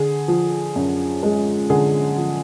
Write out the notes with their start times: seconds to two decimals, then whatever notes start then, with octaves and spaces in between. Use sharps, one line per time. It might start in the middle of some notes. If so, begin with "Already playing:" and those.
Already playing: D3 G#4
0.28 F3
0.76 F#2
1.23 G#3
1.70 D3 G#4
2.17 F3